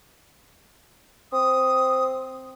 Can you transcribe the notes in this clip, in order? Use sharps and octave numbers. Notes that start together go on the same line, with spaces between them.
C4 D#6